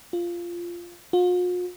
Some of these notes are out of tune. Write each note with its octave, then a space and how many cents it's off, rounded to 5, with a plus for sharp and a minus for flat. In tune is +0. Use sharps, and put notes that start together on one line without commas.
F4 -10
F4 +45